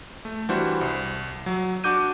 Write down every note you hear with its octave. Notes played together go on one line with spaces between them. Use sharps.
A3
E3 G3 D4 E4 F#4 C5
C2
F#3
D4 F#4 D6 G6 D#7